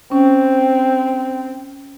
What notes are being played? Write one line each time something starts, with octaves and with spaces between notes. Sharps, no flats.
C4 C#4